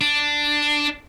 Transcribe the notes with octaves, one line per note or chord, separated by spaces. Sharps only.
D4